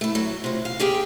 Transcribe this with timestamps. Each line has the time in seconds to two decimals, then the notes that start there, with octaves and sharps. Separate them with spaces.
0.01 A3 E4
0.15 F#3
0.44 C3 F4
0.65 F5
0.80 A#3 G4 G#4 G5